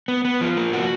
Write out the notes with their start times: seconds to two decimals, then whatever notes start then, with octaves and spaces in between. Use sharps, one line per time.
0.08 B3
0.25 B3
0.41 F3
0.57 A#3
0.73 F#4